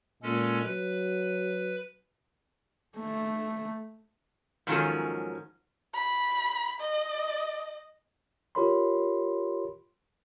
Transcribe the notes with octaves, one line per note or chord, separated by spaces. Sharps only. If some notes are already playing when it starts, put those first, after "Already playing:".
A#2 G#3 C#4 A4
F#3 B4
A3
G#2 D#3 F3 F#3 C#4 A4
B5
D#5
F4 G4 A#4 C#5 B5 C6